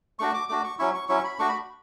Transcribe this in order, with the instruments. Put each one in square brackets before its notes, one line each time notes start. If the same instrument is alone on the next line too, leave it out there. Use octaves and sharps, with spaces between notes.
[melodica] A3 D4 F#4 C#6
D6
A3 D4 F#4 D6
C#6
F#3 C#4 E4 C#6
C#6
F#3 C#4 E4 C#6
B5
A3 D4 F#4 C#6
B5